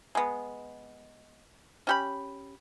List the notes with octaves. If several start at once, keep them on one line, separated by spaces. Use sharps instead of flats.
G#3 B3
C#4 G4 B5